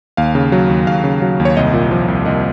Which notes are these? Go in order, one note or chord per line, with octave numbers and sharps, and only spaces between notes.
D#2 F5
C#3
F#3
D#2
D#2 F5
C#3
F#3
D#2
C#5
C2 D#5
A#2
F3
C2
C2 D#5